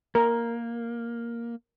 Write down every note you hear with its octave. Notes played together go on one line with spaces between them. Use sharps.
A#3 A#4